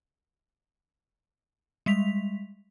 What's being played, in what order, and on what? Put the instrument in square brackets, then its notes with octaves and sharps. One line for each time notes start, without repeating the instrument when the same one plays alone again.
[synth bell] G3 G#3 B6 F7